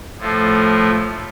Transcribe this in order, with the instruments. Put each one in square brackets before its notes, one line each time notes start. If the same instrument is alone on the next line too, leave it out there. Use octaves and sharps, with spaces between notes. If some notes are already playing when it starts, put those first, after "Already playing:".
[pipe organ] A2 F3 A3